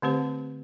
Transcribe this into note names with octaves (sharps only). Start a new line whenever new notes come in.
D3 A3 C4 G4 C5